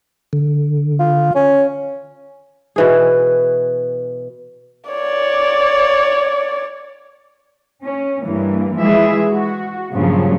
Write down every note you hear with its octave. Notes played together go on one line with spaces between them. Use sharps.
D3
F4
C#4
B2 E3 G#4
C#5 D5
C#4
G2 E3 A#3
E3 F3 G#3 E4 G#4 E5
F#4
G2 A#2 C#3 F3 F#3